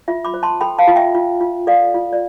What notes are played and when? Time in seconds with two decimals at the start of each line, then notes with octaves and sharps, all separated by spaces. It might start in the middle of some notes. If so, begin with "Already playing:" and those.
0.08 F4 E5
0.25 B5 D6
0.34 C5
0.43 A5 C6
0.61 A4 G5 B5
0.79 F5 A5
0.87 F4
0.96 E5 G5
1.15 F4
1.41 F4
1.67 A4 D5 F5
1.94 F4
2.13 D5